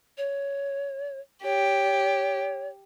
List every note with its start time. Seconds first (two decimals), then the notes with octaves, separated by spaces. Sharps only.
0.18 C#5
1.44 G4 C#5